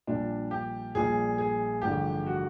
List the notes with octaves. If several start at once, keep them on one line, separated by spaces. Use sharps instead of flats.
A#1 A#2 G3 D4
G4
A#1 A#2 G3 G#4
G#4
A1 G2 D3 F3 G#3 G4
F#4